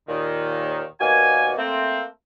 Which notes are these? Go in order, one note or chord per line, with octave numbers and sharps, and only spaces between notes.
D#2 A#2 D#3
D#2 B2 A#3 F#4 D5 G#5
A3 A#3 C4